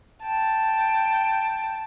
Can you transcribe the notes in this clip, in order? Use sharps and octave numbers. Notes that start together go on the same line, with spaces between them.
G5 A5